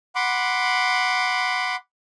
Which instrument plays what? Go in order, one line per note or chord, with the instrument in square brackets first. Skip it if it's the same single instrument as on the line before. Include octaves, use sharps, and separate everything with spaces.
[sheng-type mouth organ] F#5 B5 C6 D6